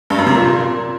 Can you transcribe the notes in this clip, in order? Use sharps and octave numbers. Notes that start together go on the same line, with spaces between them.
G2
F#2
C3
A#2